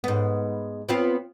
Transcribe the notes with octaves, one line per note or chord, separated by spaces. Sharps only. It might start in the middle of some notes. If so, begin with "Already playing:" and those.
G#2 B3
B3 C4 F4